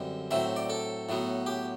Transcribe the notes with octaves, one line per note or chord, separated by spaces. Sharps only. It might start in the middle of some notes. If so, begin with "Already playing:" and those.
Already playing: F#2 D3 G3 C4
A2 F#3 C4 E5
D5
A4
A2 F#3 B3
G4